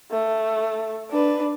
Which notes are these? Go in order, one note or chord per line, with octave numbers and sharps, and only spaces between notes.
A3
D4 B4